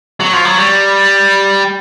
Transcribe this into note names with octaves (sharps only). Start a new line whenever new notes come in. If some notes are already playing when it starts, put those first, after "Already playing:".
F#3
F3
F#3
G3